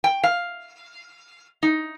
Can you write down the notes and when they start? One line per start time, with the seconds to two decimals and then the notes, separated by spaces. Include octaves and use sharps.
0.04 G5
0.24 F5
1.63 D#4